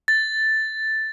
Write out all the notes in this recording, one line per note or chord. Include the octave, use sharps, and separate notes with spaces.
A6